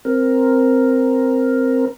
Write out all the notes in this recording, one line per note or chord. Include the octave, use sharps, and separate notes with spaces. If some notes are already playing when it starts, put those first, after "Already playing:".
C4 A#4